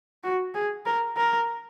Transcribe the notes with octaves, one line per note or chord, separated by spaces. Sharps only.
F#4
G#4
A#4
A#4